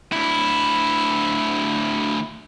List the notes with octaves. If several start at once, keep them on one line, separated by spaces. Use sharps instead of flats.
D2 E4